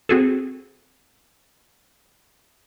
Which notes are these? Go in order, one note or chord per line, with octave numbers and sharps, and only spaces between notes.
C4 F#4 G#4 A4